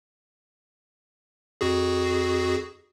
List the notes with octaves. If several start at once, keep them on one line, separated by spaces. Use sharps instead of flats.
F2 F#4 G#4